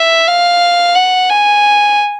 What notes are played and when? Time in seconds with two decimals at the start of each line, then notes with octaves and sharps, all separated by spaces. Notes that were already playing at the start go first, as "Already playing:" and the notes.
Already playing: E5
0.27 F5
0.95 F#5
1.30 G#5